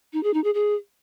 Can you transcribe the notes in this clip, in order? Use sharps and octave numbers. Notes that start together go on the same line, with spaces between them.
D#4
G#4
D#4
G#4
G#4